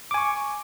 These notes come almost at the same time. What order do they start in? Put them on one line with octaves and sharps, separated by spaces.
D6 G#5 C#6